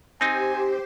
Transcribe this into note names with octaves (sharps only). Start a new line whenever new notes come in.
C4 D#4 G4 C5 G#5